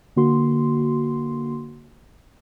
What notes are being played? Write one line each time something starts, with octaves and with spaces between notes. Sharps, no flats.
D3 A#3 F#4 C6